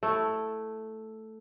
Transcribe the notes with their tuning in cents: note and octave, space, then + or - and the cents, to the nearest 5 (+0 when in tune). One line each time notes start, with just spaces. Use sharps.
A3 +0 E4 +0